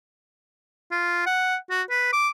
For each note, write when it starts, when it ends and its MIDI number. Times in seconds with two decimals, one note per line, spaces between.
0.91 1.24 65
1.26 1.56 78
1.70 1.82 66
1.90 2.09 71
2.13 2.29 86